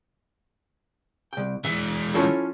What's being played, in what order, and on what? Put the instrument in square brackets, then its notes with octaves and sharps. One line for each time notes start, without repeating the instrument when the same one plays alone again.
[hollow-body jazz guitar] C2 G5
[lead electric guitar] E3 G#3 [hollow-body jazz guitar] E5
[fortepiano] F3 C#4 [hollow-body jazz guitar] E4 A4 C#5